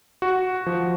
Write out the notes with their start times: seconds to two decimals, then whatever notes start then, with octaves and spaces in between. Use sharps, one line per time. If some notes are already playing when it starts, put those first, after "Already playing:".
0.22 F#4
0.66 F3